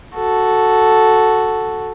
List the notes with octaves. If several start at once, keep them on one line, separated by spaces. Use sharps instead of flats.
F#4 A4